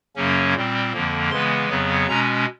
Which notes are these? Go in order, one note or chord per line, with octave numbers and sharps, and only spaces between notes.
F#2 C#3 F#3 A#3 C#4
A#2 G3 C4
F2 D3 F3 A#3
C#3 E3 G#3 B3 C6
F2 C#3 F#3 B3
B2 G#3 C#4 A#5